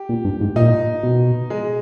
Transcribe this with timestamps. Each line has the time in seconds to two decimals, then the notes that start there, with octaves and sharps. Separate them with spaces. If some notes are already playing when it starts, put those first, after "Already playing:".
Already playing: G4
0.09 A#2
0.25 G2
0.41 G#2
0.56 A#2 D#4
1.03 B2
1.50 G#3